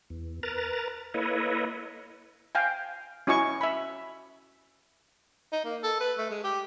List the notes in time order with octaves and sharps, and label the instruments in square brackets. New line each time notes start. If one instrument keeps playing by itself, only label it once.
[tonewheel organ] E2
A#4 B4 A#5 A6
A#3 E4 A4 B4 C#5 D#5
[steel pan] F5 G5 G#5
C#4 E4 F#4 D#5 G#5 C#6
E5 B5
[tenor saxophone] D#4
A#3
A4
B4
A3
G#3
G4